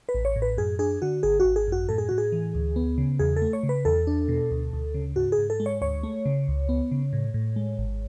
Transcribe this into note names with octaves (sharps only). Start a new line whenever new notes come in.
B4
A1
C#5
A2
B4
F#2 G#4
D4 G#4
D3 F#4
G#1 G#4
F#4
G#1
G#4
F#2 F#4
A2 A4
G#4
A2 F#4
G#4
E3
D2
B3
C#3
E2 G#4
A4
A3
C#5
C#3
B4
E2 A4
D4
B2
D2
D2
C#3
G#2 F#4
G#4
G#2
A4
G#3
C#5
D2 C#5
A3
C#3
C#2
B3
C#3
A2
A2
G#3
G#1